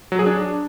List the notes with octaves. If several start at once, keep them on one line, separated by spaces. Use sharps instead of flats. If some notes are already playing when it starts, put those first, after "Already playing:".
F#3
G#4
D4